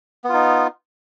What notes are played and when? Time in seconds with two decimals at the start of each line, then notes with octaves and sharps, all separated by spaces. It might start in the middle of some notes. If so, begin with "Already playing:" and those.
0.24 B3
0.29 F4
0.34 D#4